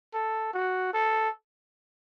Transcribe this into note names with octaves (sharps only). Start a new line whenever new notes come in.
A4
F#4
A4